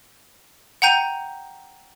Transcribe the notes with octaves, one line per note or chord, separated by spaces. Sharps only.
F#5 G5 A#5 G6 D#7